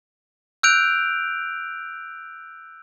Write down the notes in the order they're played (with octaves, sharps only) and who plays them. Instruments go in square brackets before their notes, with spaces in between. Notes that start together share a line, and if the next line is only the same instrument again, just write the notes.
[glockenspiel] E6 F#6 G6 D7 F7